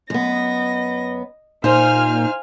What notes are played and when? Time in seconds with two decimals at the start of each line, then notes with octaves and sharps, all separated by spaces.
0.10 F#2 B3 D#5 A#6
1.64 A#2 D#4 C5 F5 G#5 F6